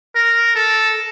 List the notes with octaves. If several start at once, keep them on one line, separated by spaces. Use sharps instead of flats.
A#4
A4